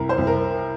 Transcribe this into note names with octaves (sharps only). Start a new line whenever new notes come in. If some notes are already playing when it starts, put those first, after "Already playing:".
Already playing: C2 A#4
C5
C2
A#4